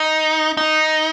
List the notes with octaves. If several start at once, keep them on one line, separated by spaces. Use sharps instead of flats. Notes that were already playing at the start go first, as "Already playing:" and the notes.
Already playing: D#4
D#4